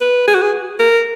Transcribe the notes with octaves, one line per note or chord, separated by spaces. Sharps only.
B4
G#4
F#4
G#4
A#4